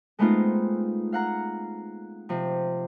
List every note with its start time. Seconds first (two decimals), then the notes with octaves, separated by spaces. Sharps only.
0.19 G#3 A3 B3 C4 D#4 F4
1.12 F5 F#5 A#5
2.29 C3 F3